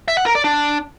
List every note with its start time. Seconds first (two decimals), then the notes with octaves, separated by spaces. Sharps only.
0.08 E5
0.17 F#5
0.26 A#4
0.35 D5
0.44 D4